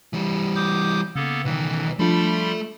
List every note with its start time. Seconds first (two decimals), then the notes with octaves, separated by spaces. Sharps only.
0.13 E3 G3
0.56 D6 D#6 G6
1.16 C#3 A#3 B3 A4
1.45 B1 D#3 E3
1.99 F3 G3 A3 D4 F4 A4 B5 C6